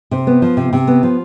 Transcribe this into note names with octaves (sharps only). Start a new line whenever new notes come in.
C3
B3
F3
C3
C3
B3
F3